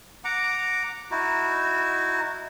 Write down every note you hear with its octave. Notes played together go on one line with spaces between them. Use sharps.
F#5 A#5 D6
D#4 E4 F#4